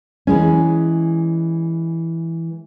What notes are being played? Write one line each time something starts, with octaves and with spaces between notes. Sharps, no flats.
E3 G#3 C#4